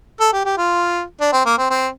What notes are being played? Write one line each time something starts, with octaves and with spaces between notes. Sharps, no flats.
A4
G4
G4
F4
D4
C4
A#3
C4
C4